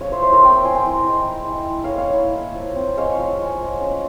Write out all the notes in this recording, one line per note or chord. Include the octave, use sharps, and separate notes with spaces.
F3 C#5 F5
C5 E5
E4 C5 E5
A#4 C#5
C4 G5 A#5
F3 G#5 C6
G5 A#5
E4
G#3
E4
G#3
E4
C#5 F5
A#3
C#5 F5
E4
A#3
F3
C4
G#3 C#5 F5
F3
G#3
F4
C#4